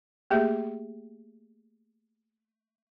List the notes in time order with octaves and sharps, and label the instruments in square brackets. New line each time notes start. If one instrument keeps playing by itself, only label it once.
[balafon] A3 A#3 G4 G#4 E5